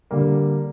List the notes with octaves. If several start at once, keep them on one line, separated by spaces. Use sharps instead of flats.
D3 G3 A#3